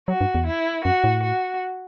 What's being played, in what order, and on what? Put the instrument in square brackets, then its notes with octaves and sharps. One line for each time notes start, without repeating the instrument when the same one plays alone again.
[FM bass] F#3 [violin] F#4
[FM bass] G2
E2
[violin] E4
[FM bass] F#2 [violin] F#4
[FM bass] A2
[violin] F#4